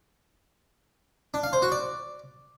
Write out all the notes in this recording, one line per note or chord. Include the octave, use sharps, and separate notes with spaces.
D4
F5
C5
F#4
D5